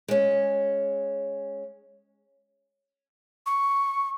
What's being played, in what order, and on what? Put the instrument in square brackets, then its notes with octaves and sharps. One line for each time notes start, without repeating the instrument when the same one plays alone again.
[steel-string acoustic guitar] G#3 C#4
[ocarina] C#6